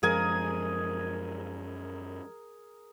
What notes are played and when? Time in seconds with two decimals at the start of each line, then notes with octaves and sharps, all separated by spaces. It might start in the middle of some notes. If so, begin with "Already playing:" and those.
0.03 F#2 F3 G#3 G#4 A#4 G#5